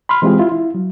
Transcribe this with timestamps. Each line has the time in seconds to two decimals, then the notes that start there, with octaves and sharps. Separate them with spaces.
0.09 B5 C6 F6
0.22 E3 G#3 C4 F4 G4 G#4
0.39 E4 F4
0.52 E4
0.74 F#3